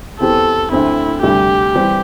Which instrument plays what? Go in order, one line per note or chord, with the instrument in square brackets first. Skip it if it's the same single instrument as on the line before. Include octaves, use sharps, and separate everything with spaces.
[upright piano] E2 E3 C4 G4 [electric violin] A4
[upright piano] D2 D3 C4 [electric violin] E4
[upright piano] D2 C3 G3 [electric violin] G4
[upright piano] E3 G3 C4